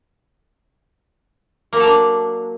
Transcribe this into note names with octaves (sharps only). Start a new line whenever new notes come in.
F#3 A#3 D4 A4 A#4